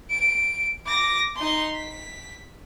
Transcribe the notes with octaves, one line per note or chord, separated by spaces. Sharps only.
D7
D6 A#6
D#4 C6
B6